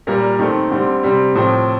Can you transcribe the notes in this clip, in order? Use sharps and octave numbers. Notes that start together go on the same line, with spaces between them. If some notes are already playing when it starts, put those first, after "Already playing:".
A#2 G3 A#3 A#4
D#3 A3 C4
D3 G3 C4
C3 G3 C4
A2 F3 C4